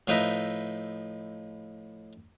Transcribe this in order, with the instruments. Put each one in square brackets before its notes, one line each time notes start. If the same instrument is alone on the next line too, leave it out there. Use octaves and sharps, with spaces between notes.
[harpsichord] A2 F3 D#4 B4 D#5 E5